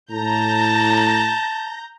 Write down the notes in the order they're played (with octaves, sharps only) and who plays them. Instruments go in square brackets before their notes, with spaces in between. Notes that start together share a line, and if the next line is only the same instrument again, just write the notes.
[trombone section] A2 [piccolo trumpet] A5 [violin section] A#5 G6 A#6